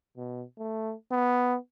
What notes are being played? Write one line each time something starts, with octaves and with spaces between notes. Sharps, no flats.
B2
A3
B3